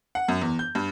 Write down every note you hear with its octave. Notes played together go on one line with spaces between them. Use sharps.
F#5
F#2
E2
G6
G2